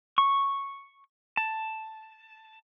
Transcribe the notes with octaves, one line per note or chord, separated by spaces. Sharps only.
C#6
A5